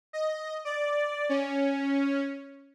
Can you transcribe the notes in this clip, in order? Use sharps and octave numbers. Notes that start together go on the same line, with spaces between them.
D#5
D5
C#4